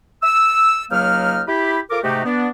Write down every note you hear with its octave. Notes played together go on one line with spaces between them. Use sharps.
E6
C#2 F#3 A#3 D#4 F6
E4 G4 B5
F4 A4 A#4 D6
G#2 C3 A3 D#4 F#4 G4
B3 D4